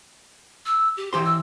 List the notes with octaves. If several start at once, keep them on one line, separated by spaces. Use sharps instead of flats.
E6
G4
E3 G4 C5 C6
E6